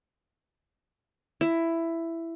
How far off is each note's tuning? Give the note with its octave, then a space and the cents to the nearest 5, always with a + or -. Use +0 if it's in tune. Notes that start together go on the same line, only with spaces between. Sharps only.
E4 +10